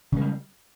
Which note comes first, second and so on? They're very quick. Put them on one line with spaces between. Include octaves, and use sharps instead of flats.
C#3 G#3 G3